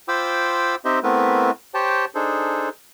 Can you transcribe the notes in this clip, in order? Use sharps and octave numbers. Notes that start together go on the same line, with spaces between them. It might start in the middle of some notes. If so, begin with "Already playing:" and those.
F4 C5 G5 B5 D6 E6
C4 D#4 G4 C5 D#5 E5
A3 B3 C4 E4 A#4 B4
G4 C5 C#5 G5 A5
D4 D#4 G#4 A4 C5